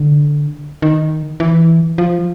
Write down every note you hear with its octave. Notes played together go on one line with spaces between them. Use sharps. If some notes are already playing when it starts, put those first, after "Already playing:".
Already playing: D3
D#3
E3
F3